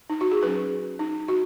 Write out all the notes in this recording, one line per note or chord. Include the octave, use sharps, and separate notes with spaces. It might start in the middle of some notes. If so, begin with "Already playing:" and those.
D#4
F#4
G#4
F#3 C#4 B4
D#4
F#4